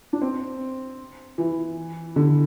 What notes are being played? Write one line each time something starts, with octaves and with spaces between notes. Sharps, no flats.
D4
C4
E3
D3